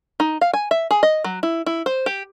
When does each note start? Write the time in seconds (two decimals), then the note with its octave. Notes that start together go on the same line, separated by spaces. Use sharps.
0.20 D#4
0.41 F5
0.53 G#5
0.71 E5
0.91 G#4
1.03 D#5
1.24 F#3
1.43 E4
1.66 E4
1.86 C5
2.06 G4